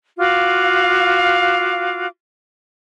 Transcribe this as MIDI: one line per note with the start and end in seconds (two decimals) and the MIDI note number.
0.18 2.06 65
0.18 2.06 66
0.18 2.06 77
0.18 2.06 86